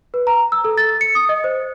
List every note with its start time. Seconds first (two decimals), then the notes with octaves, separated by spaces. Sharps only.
0.14 B4
0.27 A#5
0.52 E6
0.65 A4
0.77 A6
1.01 C#7
1.15 D#6
1.29 D#5
1.44 C5